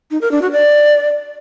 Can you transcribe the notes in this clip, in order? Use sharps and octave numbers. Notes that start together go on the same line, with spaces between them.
D#4
A#4
D4
F#4
D5